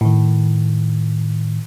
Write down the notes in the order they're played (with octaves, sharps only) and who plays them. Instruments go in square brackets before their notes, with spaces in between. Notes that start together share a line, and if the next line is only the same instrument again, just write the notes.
[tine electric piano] A2 D#3